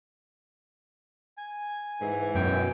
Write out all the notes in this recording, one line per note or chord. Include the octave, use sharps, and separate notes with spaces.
G#5
G#2 E3
F#2 B2 G5 G#5